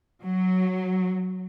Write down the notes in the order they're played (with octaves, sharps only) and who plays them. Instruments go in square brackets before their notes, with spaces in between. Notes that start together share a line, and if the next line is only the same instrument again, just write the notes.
[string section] F#3